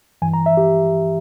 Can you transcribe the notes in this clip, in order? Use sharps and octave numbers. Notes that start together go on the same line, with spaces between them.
G2 E3 G#5
A#5
E5
G4